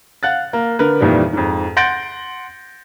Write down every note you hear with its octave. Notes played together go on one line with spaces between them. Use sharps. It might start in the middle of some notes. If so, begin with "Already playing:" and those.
F5 F#5 F#6 A6
A#3
D3 A#4 B4
F2 A#2 D#3 E3 G3
F2 G#2
F#5 C6 G6 A6 A#6 D7